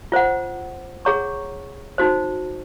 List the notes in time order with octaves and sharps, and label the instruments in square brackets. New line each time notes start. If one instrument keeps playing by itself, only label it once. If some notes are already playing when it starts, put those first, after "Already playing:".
[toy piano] F4 C5 F#5
G#4 C#5 F#5 A#5 C#6
D#4 F#4 C5